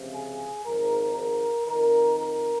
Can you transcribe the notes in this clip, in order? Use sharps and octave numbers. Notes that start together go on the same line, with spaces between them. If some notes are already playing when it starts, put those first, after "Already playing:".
Already playing: C#2 C3 F3
G#4
G#1 G#2 F3 A#4
A#4
F2 D#3 A#4
A#4